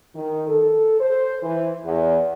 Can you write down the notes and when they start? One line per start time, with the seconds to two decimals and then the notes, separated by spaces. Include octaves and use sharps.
0.15 D#3
0.47 A4
1.00 C5
1.43 E3
1.84 E2